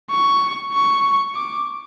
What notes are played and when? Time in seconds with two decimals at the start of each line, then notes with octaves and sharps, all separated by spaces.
0.11 C#6
0.73 C#6
1.35 D6